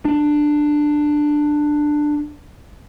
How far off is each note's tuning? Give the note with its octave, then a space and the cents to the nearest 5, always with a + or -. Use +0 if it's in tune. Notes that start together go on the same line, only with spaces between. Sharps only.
D4 +10